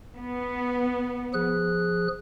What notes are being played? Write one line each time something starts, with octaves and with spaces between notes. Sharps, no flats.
B3
F3 G#4 F#6